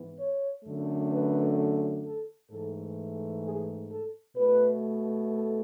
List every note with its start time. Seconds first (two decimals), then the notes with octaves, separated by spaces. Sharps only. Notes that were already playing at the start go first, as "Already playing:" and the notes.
Already playing: G#2 E3 B3
0.18 C#5
0.64 F#2 D3 A3
1.11 B4
2.04 A4
2.50 G#2 E3 A3 A4
3.43 G#4
3.90 A4
4.36 B2 A3 B4
5.30 A4